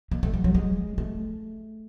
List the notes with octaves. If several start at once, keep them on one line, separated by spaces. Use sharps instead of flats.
A#3
A3
G3
F#3
G#3
A3